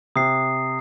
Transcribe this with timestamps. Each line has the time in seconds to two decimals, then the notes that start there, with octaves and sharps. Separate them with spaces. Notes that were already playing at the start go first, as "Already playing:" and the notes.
0.16 C3 D#6 C7